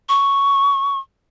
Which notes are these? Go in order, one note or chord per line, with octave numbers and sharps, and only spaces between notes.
C#6